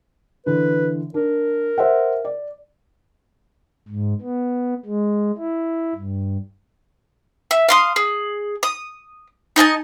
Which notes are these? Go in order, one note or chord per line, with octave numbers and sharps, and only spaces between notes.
D3 E3 B4
D4 A#4
C5 E5 F#5
D5
G#2
B3
G#3
E4
G2
E5
F5 C6 D#6
G#4
D#6
D#4 D#5 G#5 A5